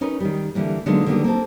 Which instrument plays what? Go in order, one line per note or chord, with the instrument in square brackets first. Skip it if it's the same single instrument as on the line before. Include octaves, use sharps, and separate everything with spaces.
[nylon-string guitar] C#4 D#4 A#4 B4
D#3 G3
D3 E3 G3 A#3
D3 F#3 G#3 A#3 B3 D#4
D3 D#3 G3 A#3 B3
A#3 C4 A4